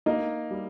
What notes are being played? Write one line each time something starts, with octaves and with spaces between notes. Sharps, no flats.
A#3 D#4
G3